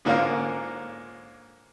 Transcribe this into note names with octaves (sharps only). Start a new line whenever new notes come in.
G#2 D3 A#3 C#4 F4 A#4